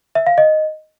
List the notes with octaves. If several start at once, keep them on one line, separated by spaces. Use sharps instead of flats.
E5
F5
D#5